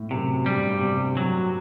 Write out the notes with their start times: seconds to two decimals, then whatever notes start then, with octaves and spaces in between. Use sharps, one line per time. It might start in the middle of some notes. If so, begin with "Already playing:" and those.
Already playing: A2
0.11 F#2 C3
0.46 G2 G3
0.70 G2
0.81 C3
1.17 F#3